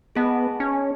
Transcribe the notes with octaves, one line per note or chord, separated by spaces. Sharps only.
B3 G#4 D#5 A5
C#4